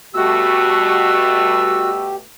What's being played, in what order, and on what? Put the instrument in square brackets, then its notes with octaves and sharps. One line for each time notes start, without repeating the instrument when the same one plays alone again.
[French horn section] B2 G3 A3 [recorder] F#4 [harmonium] G4 [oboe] E6